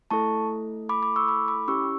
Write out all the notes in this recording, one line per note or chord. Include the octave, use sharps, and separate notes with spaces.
A3 E4 A4 A5 C#6
B5 D6
B5 D6
C#6 E6
B5 D6
B5 D6
C#4 E4 G4 C#6 E6